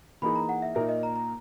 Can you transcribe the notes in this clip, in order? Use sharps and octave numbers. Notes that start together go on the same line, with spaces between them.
E3 A#3 D#4 G#4 B5
A#5
F#5
E5
A#2 A#3 D#4 A#4 E5
D#5
A#5
A#5